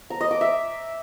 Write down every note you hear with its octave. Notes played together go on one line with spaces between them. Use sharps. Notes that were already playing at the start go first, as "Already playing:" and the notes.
A#5
D#5
D6
E5